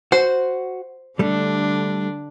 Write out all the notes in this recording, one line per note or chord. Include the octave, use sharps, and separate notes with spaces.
F#4 C5
D3 G3 A3 D4